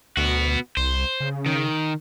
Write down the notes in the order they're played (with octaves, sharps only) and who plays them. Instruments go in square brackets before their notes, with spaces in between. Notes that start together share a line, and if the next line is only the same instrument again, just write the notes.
[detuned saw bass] D2 [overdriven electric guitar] B3 F#4
[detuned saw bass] C2 [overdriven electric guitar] C5
[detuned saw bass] C#3
[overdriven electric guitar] D#3